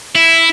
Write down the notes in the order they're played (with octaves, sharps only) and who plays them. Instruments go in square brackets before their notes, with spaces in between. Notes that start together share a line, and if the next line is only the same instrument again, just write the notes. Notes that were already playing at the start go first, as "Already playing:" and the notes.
[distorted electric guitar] E4